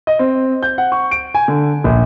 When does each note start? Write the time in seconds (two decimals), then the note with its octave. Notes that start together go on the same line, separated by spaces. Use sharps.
0.07 D#5
0.19 C4
0.63 G6
0.78 F#5
0.92 C#6
1.11 D7
1.35 G#5
1.48 D3
1.84 A#1